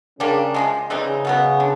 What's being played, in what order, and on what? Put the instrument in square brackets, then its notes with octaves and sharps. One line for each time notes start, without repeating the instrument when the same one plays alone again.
[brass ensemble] C#3 [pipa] G3 A#3 D4
[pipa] C3 F3 G#3
[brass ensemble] C#3 [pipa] E3 G3 C4 D#4
[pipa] B2 F#3 B3
D3